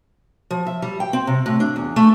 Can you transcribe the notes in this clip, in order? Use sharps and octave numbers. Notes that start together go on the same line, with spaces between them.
F3
E5
G3
G5
C4
C3
A2
D4
E2
A3